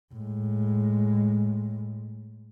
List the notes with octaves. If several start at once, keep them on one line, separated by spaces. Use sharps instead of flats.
A2 G#3